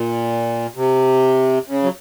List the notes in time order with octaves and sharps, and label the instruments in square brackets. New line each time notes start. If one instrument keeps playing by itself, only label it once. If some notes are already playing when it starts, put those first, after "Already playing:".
Already playing: [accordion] A#2
C3
C#3
F#3